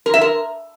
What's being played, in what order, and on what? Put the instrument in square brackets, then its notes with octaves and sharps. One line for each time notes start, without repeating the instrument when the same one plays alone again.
[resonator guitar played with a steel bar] A#4
E5
A#4